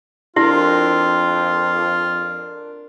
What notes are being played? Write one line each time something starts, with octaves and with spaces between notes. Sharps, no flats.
F2 D4 E4 F4 G4 A#4